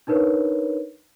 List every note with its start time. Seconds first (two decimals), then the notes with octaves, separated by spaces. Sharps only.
0.07 D4 D#4 A#4 B4 C#5